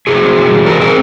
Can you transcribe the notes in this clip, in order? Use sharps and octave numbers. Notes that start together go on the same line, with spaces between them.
C3 F#4 G#4
C4
E3
G3
C3 G#4 A#4
C4 G#4 A#4